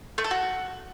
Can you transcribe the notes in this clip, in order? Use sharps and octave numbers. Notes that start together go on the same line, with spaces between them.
A3
A4
F#4